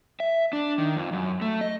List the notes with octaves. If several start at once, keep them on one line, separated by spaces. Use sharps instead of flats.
E5
D4
D#3
F2
F#2
A3
D#5